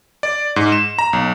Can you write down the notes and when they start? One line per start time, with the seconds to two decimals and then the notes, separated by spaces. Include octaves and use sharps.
0.23 D5
0.56 G#2
0.72 E7
0.99 A#5
1.13 B1